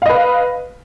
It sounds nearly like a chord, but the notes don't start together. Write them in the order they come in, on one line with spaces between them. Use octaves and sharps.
F5 D#5 B4